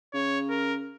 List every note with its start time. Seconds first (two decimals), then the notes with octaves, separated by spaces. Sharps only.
0.14 C#3 C#5
0.50 A#4